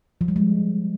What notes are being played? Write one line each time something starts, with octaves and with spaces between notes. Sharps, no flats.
F3
G3
G#3